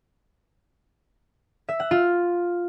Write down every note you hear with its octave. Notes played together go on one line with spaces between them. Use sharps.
E5
F#5
F4